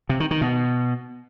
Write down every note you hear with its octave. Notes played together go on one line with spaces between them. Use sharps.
C3
D#3
D#3
B2